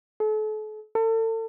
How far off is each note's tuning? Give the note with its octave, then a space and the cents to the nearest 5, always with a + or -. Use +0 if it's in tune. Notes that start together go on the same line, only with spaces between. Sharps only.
A4 -40
A4 +35